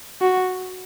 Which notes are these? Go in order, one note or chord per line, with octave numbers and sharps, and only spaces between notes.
F#4